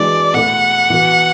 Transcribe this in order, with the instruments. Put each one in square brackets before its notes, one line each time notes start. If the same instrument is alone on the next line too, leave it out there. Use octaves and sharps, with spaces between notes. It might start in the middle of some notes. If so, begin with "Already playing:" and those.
Already playing: [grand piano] E3 G#3 D4 F#4 [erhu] D5
[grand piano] B2 A3 E4 [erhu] F#5
[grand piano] E3 B3 F#4